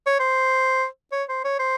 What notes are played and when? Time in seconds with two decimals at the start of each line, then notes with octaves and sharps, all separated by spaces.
0.06 C#5
0.20 C5
1.12 C#5
1.29 C5
1.44 C#5
1.59 C5